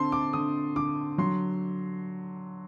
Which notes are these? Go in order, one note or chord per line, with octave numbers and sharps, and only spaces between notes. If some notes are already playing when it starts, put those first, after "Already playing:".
Already playing: D3 C4 A5 C6
D6
D3 D#6
D3 D6
F#3 C6